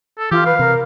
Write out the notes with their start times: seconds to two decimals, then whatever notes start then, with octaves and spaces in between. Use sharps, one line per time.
0.18 A4
0.31 E3 F4 G4
0.45 B4 F5
0.59 C3 A#4